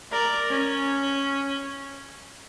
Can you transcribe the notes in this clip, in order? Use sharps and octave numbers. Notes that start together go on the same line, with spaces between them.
A#4 D5
C#4